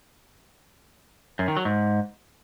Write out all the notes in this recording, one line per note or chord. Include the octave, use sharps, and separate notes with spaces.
F#2
D#3
F#3
G#2